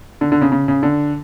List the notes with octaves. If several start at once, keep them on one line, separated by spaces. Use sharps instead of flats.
D3
D3
C#3
C#3
C#3
D3